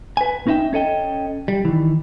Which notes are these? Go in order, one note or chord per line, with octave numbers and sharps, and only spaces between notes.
B4 G#5
C#4 D#4 E4 E5 G5
C#4 A4 D#5 G5
G3
D#3 E3